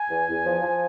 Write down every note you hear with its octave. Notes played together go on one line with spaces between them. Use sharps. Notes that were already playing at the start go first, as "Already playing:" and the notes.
Already playing: G#5
E2
E2
F3
F3